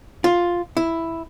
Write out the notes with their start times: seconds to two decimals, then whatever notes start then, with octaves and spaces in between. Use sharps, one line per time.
0.24 F4
0.77 E4